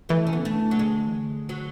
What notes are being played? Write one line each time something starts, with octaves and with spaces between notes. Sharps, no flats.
E3 A3
C#4
B3
C#3
D3 A3
F#3
G#3
E3
D3
F#3